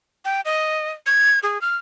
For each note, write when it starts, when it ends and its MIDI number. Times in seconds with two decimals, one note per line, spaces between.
0.25 0.41 79
0.45 0.91 75
1.06 1.39 92
1.43 1.61 68
1.61 1.76 89